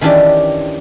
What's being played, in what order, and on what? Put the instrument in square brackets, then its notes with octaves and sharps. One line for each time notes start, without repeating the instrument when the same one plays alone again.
[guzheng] D#3 E3 C#4 D4 G4